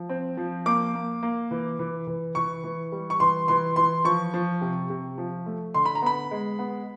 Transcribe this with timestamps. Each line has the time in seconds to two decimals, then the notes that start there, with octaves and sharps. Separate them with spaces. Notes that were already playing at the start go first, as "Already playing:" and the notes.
Already playing: F3
0.09 C4
0.37 F3
0.66 A#3 D6
0.95 A#3
1.23 A#3
1.51 E3
1.79 E3
2.07 E3
2.35 E3 C#6
2.64 E3
2.92 G3
3.10 C#6
3.20 E3 C6
3.48 E3 C6
3.76 E3 C6
4.04 F3 C#6
4.34 F3
4.61 C3
4.90 C3
5.18 F3
5.46 A3
5.74 D3 C6
5.85 B5
5.95 A#5
6.02 B3 B5
6.31 G#3
6.59 B3